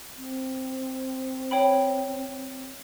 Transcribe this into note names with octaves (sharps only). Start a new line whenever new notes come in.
C4
C#5 G5 B5